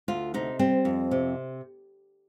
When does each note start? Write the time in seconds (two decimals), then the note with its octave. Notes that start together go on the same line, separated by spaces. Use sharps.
0.08 D2 F4
0.34 C3 D#4
0.59 G3 C4
0.85 F2
1.11 C3